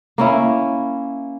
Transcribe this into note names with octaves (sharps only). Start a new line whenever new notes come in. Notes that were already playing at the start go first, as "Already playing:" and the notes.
A#3 C#4 E4